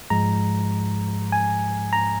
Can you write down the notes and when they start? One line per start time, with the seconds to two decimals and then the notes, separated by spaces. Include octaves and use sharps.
0.10 G#2 F3 G#3 A#5
1.32 G#5
1.93 A#5